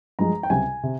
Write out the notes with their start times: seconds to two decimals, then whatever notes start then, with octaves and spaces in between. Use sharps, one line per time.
0.19 G2 F3 G#3 A#5
0.43 G5
0.50 C#2 C3 G3 G#5
0.83 C3